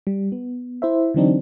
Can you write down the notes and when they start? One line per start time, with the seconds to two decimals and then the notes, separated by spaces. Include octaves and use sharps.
0.07 G3
0.32 B3
0.82 E4 C5 E5
1.14 D3 E3 F#3 C4 D4 D#4